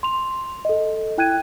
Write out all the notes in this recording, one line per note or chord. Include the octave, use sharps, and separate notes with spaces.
C6 F7
A4 D#5
E4 G5 F#6 G#6 D#7